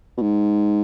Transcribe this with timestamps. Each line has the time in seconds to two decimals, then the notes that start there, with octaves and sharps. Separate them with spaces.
0.17 B2
0.22 G#2